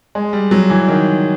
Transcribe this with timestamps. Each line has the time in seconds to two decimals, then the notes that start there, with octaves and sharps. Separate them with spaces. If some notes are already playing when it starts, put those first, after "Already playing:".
0.15 G#3
0.33 G3
0.51 F#3
0.70 E3
0.88 D#3